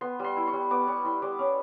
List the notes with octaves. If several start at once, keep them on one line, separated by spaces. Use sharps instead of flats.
B3 C6
G3 C6
E4
C#6
G3
B3 D6
G3 C#6
E4 C6
G3 D6
C#4